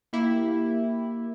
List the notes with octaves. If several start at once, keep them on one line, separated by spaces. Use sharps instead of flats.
A#3 E4 G4